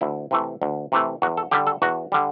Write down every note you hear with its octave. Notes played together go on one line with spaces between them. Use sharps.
D2 E4
C3 E3 A3
D2
C3 E3 A3
E2 F#4
A4
D3 G3 G4
A4
E2 F#4
D3 G3